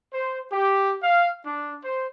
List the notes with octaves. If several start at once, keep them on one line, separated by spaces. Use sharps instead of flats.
C5
G4
F5
D4
C5